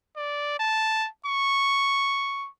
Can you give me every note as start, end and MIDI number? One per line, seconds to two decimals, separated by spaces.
0.16 0.57 74
0.60 1.08 81
1.26 2.48 85